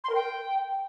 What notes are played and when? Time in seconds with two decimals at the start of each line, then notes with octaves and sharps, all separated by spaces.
0.04 C6
0.09 A#4
0.15 G5